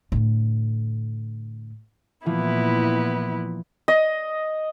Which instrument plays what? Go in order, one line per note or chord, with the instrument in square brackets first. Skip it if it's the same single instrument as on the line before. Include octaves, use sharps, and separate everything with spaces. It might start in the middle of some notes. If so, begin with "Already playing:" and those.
[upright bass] A2 D3
[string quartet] A#2 B3 E4 [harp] E3 F3
[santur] D#5